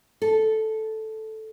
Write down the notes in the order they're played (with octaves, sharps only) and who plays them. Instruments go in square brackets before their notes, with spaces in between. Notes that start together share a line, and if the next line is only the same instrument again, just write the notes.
[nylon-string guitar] A4